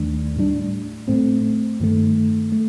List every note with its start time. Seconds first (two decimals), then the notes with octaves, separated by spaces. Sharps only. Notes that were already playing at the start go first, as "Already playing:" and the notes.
Already playing: D#2 D#3 A3 D4
0.37 A2 G3 D4
1.08 A2 A3 C4
1.80 G2 D#3 A3
2.52 A3